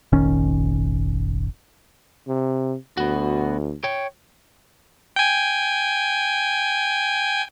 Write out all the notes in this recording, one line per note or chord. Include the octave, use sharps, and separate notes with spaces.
F1 A#1 D#3 C#4
C3
D2 B3 F#4
C#5 G5
G5 G#5